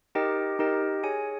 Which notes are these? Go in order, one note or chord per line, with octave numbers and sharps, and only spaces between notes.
D#4 G4 A#4 D#5 G5
D#4 G4 A#4 D#5 G5
G#4 C#5 G#5